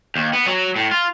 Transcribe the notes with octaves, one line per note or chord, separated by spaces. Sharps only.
D#2
B3
F#3
A2
F4